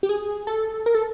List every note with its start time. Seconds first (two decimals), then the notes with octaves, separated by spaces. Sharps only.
0.03 G4
0.09 G#4
0.47 A4
0.86 A#4
0.95 A4